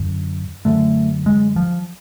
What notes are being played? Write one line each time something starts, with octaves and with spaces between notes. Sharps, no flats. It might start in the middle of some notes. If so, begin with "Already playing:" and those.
Already playing: F#2 D3
F#2 D3 A3
G#3
F3